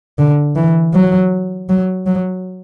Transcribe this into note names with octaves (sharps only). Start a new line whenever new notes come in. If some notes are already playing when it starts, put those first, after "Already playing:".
D3
E3
F#3
F#3
F#3